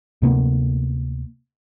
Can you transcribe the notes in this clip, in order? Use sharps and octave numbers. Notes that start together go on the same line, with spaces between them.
D2 C3 A#3 B3